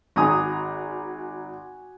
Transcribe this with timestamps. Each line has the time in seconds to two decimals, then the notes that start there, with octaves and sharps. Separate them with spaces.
0.16 G#1 F#4 G#5 A#5 D#6